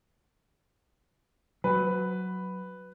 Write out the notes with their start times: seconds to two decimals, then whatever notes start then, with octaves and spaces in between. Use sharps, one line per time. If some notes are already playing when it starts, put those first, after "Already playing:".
1.64 F#3 B4